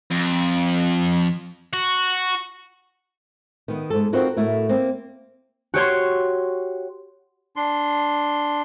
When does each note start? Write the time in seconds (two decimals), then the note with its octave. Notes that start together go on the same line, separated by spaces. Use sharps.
0.11 F2
1.73 F#4
3.68 D#3 B3
3.90 G#2 A4
4.13 C4 D#4 F4 F#4 A#4 B4
4.37 A2 A3 E4 F#4 A#4
4.69 A#3 C4
5.74 F#4 G4 C#5 C6
7.56 D4 C6